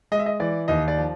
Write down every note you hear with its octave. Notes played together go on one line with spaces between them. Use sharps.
G#3 D#5
E5
D#5
E3 D5
D#2 D#5
D5
F3